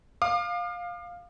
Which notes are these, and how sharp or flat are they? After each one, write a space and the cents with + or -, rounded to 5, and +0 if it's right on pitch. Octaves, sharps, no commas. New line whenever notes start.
F5 +10 D6 +45